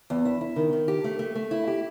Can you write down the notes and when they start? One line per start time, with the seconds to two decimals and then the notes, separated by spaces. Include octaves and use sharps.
0.10 E2
0.25 E4
0.41 E4
0.56 D#3
0.73 D#3
0.88 G4
1.04 A3
1.19 A3
1.35 A3
1.51 E4
1.67 G4